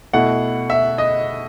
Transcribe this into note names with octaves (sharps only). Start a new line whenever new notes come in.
B2 A3 E4 F#5
E5
D#5